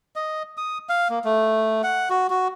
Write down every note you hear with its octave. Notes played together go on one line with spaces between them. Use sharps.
D#5
D#6
F5
A#3
A3
F#5
F#4
F#4